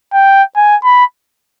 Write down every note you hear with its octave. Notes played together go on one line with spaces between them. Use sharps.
G5
G#5
B5